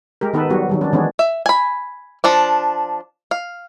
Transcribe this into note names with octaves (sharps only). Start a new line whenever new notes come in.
G#3 G4 A#4
D#3 B3 D#4 A4 B4
F#3 G3 B3 F#4
D#3 F#3 G3
C#4 D4
D#3 E3 G#3 B3 C#4 D4
E5
G#5 B5
F3 D4 D5
F5